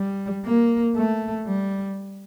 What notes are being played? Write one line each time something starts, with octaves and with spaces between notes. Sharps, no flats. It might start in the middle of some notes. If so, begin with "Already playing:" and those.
Already playing: G3
A#3
A3
G3